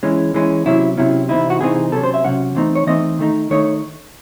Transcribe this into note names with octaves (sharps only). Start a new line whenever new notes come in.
E3 G#3 C#4
E3 G#3 C#4
C3 F#3 C#4 E4
C3 F#3 C#4 E4
C3 E3 C4 D#4 E4
F#4
C3 E3 C4 D#4 G#4
C3 F#3 C#4 A4
C5
E5
C3 F#3 C#4 F#5
E3 A3 C4 D#4
C#5
E3 A3 C4 D#4 D#5
D#3 A3 D#4
D#3 A3 D#4 C#5